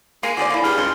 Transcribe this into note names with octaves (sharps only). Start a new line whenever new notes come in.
G#3 A#3 G#5 C7
D3 F#4 G#4 D5 C7
A#3 E4
G2 G#4 F6
C#2 G3 D#4 C6